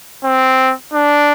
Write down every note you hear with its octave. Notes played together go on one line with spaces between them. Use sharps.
C4
D4